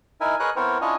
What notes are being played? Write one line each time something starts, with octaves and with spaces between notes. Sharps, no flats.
D#4 E4 A#4 E5 G#5
G#4 A#4 B4 C#5 D#5 F#6
B3 C4 E4 A#4 C5 C#5
C#4 D4 E4 F4 C#5 D#5